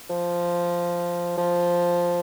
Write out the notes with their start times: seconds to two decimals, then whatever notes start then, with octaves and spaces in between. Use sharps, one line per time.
0.10 F3
1.38 F3